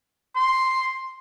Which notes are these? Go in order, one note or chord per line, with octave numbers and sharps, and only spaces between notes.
C6